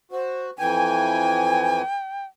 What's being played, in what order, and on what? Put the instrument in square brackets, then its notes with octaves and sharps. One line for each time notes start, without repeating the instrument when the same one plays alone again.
[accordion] F#4 [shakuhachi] C5
[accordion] F2 E3 G#5 [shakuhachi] G5